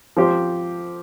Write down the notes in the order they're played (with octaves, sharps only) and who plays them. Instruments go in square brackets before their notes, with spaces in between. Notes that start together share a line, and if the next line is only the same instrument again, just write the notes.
[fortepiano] F3 C4 G4 C5